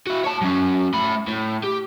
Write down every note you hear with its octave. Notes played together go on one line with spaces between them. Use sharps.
E4 F#4
C#5 A5
F#3 C#4
A3 B5
A2
G4